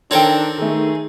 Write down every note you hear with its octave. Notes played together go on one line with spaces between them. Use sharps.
D#3 C4 D4 A4 A#4 C#5 G5
D#3 A3 G#4